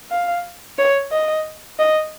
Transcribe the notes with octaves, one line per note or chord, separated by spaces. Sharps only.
F5
C#5
D#5
D#5